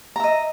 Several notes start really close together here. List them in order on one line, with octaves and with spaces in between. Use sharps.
A#5 E5 D#5